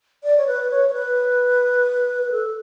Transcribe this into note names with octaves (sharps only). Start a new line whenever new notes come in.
D5
C#5
B4
C#5
C#5
B4
B4
A4